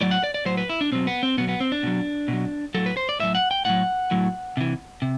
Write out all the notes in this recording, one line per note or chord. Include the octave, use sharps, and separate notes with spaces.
A2 F#3 D5
F#5
D5
D5
A2 F#3 C5
B4
E4
D4
B2 F#3 C4
B3
C4
B2 F#3 B3
B3
C4
D4
B2 F#3
B2 F#3
A2 F#3 A4
B4
C5
D5
A2 F#3 E5
F#5
G5
A2 F#3 F#5
A2 F#3
C3 E3
C3